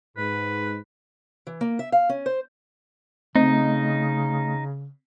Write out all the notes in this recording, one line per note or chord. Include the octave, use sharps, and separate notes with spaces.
G#2 B4
E3
A#3
E5
F5
C#4
C5
C#3 A3 C4 D#4 D#5